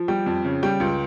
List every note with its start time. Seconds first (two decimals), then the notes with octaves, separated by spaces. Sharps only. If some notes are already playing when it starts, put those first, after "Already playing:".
Already playing: F3
0.08 G3 G5
0.26 F2
0.44 C#3
0.63 G3 G5
0.80 C#2